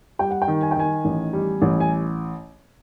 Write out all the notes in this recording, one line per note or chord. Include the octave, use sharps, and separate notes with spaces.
G3 G5
F#5
G5
D#3
G#5
G5
D#3 G#5
A1
G3
A1
G#5